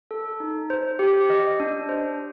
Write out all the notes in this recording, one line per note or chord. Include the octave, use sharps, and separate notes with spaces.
A4
D#4
C5
G4
D#5
D4
C5